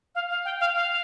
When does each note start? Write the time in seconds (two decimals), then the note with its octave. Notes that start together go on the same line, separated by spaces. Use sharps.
0.15 F5
0.30 F5
0.45 G5
0.60 F5
0.75 F5